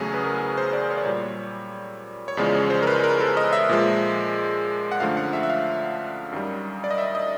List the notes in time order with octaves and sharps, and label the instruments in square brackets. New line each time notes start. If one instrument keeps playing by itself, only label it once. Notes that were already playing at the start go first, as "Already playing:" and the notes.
Already playing: [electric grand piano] E2 C#3 F#3 A3 G#4
B4
A#4
C5
D5
C#5
D5
A#2 G3 C#5
C#5
E2 C#3 F3 G#3 D5
C#5
C5
A#4
B4
A#4
A4
D#5
E5
A#2 F3 G#3
F#5
F#2 D3 F3 A3 F5
F#5
E5
E5
F5
F#2 D#3 G3
D5
D#5
E5
D#5